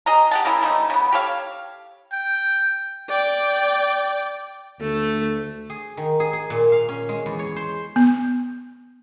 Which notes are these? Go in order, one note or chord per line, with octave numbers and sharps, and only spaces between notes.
G#4 D#5 A#5
G4 F#5 A5
A#3 C#4 E4 G#4
F3 G3 A3 D#4
C#3 B3
G4 A4 C#5 F5
G5
D5 G5
D2 A3
G#4
D#3
G#4
G#4
A#2
F5
C#4
G#3
E2
C#5
C5
B3